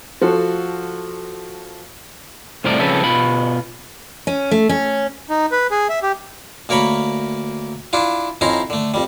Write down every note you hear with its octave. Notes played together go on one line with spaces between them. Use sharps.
F3 F#4 A4
C2 F2 A2 F3 A#4 D5
C#3 F3 C4 C#4 A4 B4
B2 F4 B5
C#4
A3
C#4
D#4
B4
G#4
E5
G4
D2 A#3 A#4 C#5 B5 C#6
D4 E4 F4
F2 C#4 D#4 E4 A#5 C6
D3 A3
F2 G3